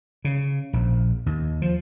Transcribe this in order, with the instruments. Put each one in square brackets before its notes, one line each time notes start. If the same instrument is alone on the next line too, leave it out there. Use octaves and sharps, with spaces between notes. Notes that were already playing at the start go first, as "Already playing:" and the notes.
[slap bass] C#3
A#1
D#2
F3